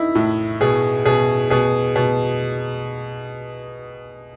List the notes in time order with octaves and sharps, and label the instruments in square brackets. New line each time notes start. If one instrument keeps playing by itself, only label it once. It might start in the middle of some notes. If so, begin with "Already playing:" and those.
Already playing: [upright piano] D#3 D#4 [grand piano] E4
[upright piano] A2
[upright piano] B2 [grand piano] G#4
[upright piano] B2 [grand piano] G#4
[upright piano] B2 [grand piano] G#4
[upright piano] B2